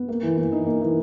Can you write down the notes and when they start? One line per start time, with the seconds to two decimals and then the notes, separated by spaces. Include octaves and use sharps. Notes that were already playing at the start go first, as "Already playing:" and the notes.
Already playing: B3
0.08 A#3
0.23 E3
0.37 E3
0.52 D#4
0.66 A#3
0.81 E3